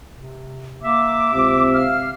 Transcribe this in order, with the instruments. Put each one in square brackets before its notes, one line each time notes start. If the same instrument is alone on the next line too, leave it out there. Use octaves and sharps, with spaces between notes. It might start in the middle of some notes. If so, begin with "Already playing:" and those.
[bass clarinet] C3
[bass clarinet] A#3 [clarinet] E5 [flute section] D6
[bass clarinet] C#2 [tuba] C3
[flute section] F5 F6